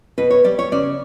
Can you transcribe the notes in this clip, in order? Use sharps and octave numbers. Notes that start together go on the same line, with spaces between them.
B2 B4
C#5
G3 D5
C#5
C#3 D5